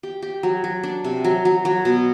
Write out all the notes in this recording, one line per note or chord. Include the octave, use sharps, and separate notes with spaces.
G4
G4
F#3
F#3
D4
C3
F#3
F#3
F#3
B2